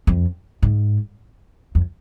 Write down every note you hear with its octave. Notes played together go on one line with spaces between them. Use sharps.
F2
G#2
F2